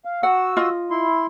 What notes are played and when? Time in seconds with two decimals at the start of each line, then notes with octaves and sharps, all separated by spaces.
0.05 F5
0.23 F#4 F#5 E6
0.57 F4 D#5
0.91 E4 C6